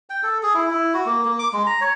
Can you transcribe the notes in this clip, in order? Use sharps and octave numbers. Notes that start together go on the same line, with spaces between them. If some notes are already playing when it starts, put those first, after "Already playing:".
G5
A4
G#4
E4
E4
F#4
A#3
A#3
D6
G#3
A#5
C#5